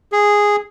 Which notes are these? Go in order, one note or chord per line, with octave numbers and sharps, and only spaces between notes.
G#4